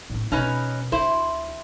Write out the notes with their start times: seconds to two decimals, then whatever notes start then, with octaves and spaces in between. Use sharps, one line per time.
0.10 A2 C4
0.32 E1 B2 C#4 D#4 B4
0.92 D2 E4 C5